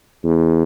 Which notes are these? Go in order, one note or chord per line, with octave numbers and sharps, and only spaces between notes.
E2